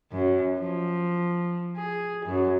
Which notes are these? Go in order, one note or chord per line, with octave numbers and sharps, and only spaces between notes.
F#2
F3
G#4
F#2